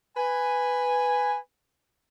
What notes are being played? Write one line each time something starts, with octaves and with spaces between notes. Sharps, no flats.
B4 G#5